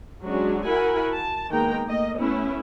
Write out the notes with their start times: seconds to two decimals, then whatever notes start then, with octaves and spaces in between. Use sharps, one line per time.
0.24 F#3 G#3 C#4 D4 F#4
0.67 E4 F#4 A#4 F#5 G#5 B5
1.13 A5
1.51 D#3 G#3 A#3 B3 G5 A#5
1.86 A3 A#3 D#5
2.18 A3 B3 C#4 E4